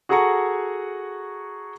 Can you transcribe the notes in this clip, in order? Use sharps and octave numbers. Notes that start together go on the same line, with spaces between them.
F#4 G#4 A4 F#5 A#5 C#6